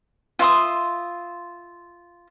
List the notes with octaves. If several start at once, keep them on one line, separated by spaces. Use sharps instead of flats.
F4 E5 C6 D#6